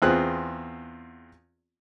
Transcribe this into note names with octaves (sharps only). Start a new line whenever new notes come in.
E2 B3 C4 F4 G#4 F#6